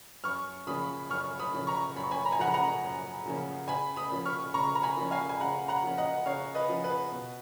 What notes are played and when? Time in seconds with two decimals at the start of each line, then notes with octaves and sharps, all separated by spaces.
0.24 F#2 C#6 F6
0.67 C#3 F3 A#3 C#4 B5 D#6
1.10 F#2 C#6 F6
1.39 B5 D#6
1.54 C#3 F3 A#3 C#4
1.67 A#5 C#6
1.96 F#2 B5
2.03 C#6
2.11 G#5 B5
2.26 A#5
2.32 G#5
2.39 C#3 F3 A#3 C#4 F#5 A#5
2.54 F#5 A#5
2.83 F#2
3.25 C#3 F3 A#3 C#4
3.68 C#3 G#5 B5
3.96 B5 D#6
4.12 F3 A#3 C#4
4.25 C#6 F6
4.54 C#3 A#5 C#6
4.75 A#5
4.83 G#5 B5
4.97 F3 A#3 C#4
5.11 F5 G#5
5.29 G#5
5.40 C#3 F#5 A#5
5.68 F#5 A#5
5.83 F3 A#3 C#4
5.98 D#5 F#5
6.26 C#3 C#5 F5
6.55 B4 D#5
6.69 F3 A#3 C#4
6.84 B4
7.12 B2